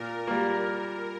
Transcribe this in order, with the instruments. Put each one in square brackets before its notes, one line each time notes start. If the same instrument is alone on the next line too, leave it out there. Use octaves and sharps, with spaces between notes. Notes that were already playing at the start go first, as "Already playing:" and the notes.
Already playing: [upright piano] A#2 [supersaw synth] A#4
[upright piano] G3 A#3